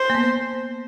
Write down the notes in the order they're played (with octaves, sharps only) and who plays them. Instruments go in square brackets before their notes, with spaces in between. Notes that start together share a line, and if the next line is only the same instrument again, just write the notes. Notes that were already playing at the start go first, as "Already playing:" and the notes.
Already playing: [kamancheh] C5
[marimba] A#3
B3